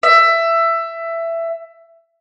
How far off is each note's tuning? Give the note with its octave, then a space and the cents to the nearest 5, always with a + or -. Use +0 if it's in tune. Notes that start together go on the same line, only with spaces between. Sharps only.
E5 +15